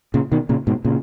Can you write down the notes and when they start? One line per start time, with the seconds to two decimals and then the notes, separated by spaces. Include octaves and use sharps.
0.14 A#2 C#3
0.32 B2 D#3
0.49 A#2 C#3
0.67 G#2 B2
0.85 A#2 C#3